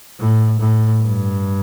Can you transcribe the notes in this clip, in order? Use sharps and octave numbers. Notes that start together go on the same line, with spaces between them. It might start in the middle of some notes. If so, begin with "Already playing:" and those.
A2
A2
G2